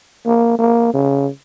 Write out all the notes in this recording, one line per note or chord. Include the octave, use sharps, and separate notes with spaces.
A#3
A#3
C#3